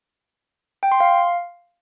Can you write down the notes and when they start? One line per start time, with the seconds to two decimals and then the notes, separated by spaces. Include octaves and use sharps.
0.83 G5
0.92 C6
1.00 F5